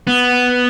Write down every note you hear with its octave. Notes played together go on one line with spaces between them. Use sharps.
B3